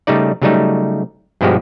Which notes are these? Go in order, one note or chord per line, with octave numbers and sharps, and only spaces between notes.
C#3 G3 A3 D#4 D5
C#3 F#3 G3 A3 D#4
G2 B2 F3 G#3 F#4 G4